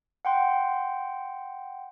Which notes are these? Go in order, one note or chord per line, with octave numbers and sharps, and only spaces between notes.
F#5 G5 C6